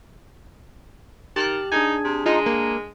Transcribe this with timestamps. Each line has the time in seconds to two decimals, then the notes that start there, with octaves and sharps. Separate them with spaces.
1.36 D#3 G4 A5 F6 F#6
1.72 D4 D#4 G#4 G#5 G#6
2.04 C3
2.26 G#3 D#4 F4
2.46 A#3